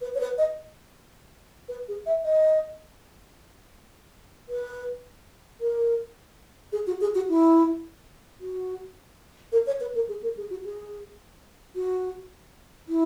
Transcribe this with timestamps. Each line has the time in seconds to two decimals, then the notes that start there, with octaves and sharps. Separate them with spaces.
0.01 B4
0.15 C#5
0.20 B4
0.38 D#5
1.69 B4
1.88 G#4
2.06 E5
2.25 D#5
4.49 B4
5.61 A#4
6.72 G#4
6.87 F#4
7.01 G#4
7.15 F#4
7.29 E4
8.41 F#4
9.52 A#4
9.67 C#5
9.80 B4
9.95 A#4
10.09 G#4
10.23 A#4
10.37 G#4
10.50 F#4
10.65 G#4
11.76 F#4
12.88 E4